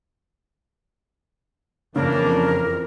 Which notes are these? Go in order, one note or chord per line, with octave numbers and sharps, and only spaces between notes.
F2 C#3 E3 A#3 D4 A#4